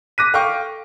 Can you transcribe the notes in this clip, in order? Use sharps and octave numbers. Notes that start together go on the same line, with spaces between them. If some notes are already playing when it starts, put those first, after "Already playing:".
D6 F#6 A#6 B6 D#7
A4 F5 G5 C#6